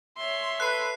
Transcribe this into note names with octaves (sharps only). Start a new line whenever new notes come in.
C#5 E5 C6
A4 B4 F#6 C7